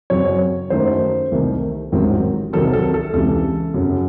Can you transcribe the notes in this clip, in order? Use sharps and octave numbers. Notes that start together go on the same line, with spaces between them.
F#2 C#3 F#3 C4 C#5
F#2 D#3 F#3 A3 D#4 C5
C2 C3 D#3 A3
A1 G#2 D#3 F#3 C4
C2 C3 D#3 F#3 C4 A4
A4
A4
C#2 C3 E3 A4
F#2 C#3 F#3